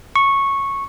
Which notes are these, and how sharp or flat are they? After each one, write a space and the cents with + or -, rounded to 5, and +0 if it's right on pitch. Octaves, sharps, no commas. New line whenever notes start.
C#6 -10